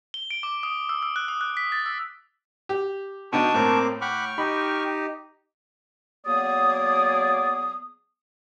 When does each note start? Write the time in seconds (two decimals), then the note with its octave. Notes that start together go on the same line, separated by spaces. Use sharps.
0.14 G7
0.31 D7
0.43 D6
0.63 D#6
0.89 E6
1.03 E6
1.16 F#6
1.28 D#6
1.41 F#6
1.57 B6
1.72 A6
1.86 E6
2.69 G4
3.33 B2 D3 D4 D#4 G5 A5 C#6 D#6
3.54 A2 A#3 C4 D6
4.01 F#5 G5 B5 C#6 D6 F6
4.38 D#4 G4 B5
6.26 F#3 A#3 B3 G#4 D5 D#6